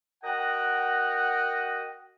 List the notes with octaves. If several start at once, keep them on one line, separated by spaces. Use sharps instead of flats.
F#4 A#4 D#5 F#5 G5